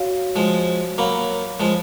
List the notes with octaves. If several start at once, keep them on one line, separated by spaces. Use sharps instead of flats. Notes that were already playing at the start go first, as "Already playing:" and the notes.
Already playing: F#4 C#5 F5
F3 G#3
F#3 A#3 C#5 F5 B5
F3 G#3